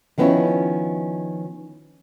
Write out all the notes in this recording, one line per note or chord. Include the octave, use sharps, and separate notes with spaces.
D#3 F3 B3 C#4 D#4 E4